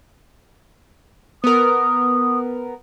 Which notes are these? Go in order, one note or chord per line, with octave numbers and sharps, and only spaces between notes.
B3 A#4 D#6